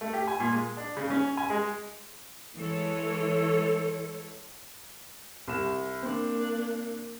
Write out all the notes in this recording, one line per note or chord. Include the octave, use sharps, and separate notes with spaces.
A3
G4
G#5
A#2
G#3
D4
C#3
C#4
G#5
G#3
E3 G#3 A4 C#5
C2 E7
A#3 C4 D4